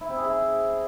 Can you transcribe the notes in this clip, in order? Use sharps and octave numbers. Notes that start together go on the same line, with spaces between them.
E4
C4
G#4
E4